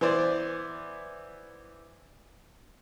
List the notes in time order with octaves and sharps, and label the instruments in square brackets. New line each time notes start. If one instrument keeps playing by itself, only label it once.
[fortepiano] E3 B3 C5 D5